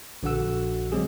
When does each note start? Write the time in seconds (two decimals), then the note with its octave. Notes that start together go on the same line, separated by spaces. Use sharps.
0.23 A#1 D3 F#4 F#5 E6
0.92 F#3 G#3 C4 G4 G#4